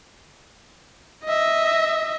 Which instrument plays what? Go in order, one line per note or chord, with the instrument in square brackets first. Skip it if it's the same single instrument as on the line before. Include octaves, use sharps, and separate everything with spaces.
[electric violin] D#5 E5